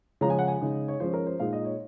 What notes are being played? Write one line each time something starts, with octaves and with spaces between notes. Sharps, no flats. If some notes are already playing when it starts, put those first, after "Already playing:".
C#3 F3 G#3 C#4 A#5
G#5
F#5
G#5
C#3 G#3 D#4
C#5
F3 G#3 C#4 C5
A#4
C5
A#2 G#3 D#4 F5
D#5
C#5